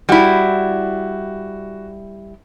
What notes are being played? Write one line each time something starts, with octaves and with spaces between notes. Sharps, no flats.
G3 E4 F#4